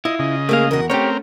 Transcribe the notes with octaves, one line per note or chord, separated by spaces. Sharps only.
E4 F4 D#5
C#3 D#5
A3 A#3 G#4 F5
E2 F#4 A#4
A3 C4 C#4 G4 A#4 C#5